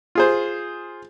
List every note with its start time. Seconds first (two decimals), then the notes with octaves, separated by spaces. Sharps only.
0.15 F4 G#4 C5